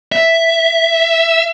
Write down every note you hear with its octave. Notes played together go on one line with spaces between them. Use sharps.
E5